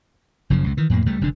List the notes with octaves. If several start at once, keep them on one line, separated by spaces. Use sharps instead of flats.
F#1 F#2 C#3 F3
C#2 C3
D#3 E3
F2 A2 A#3
C#2 C#3 G3 A3
F1 F2 D3 D4